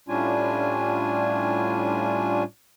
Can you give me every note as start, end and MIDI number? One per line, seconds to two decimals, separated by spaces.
0.09 2.43 45
0.09 2.43 55
0.09 2.43 61
0.09 2.43 62
0.09 2.43 65
0.09 2.43 80